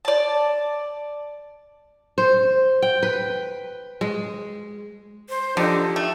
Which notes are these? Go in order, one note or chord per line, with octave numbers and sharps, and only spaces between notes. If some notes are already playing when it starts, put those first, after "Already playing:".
D5 A5
C5
G5
B4
G#3
C5
D3 F3 D#4 G4 A4
A3